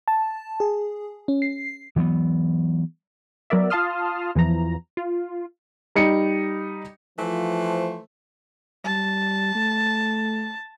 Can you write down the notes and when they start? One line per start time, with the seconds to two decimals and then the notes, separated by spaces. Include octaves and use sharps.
0.08 A5
0.60 G#4
1.28 C#4
1.42 C7
1.96 E3 F#3 A#3 B3
3.50 F#3 B3 A#4 D5 E5
3.70 F4 F5 A5 C6 D#6 F6
4.35 E2 E3 F3 A#5
4.97 F4
5.96 G3 D#4 C#7
7.19 E3 F3 A3 C5
8.85 G3 A5
9.55 A3